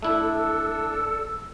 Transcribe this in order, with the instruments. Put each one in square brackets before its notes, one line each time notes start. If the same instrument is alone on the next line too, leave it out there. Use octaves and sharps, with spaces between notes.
[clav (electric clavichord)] A3 E4 [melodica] D4 [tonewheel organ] A4 [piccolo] E6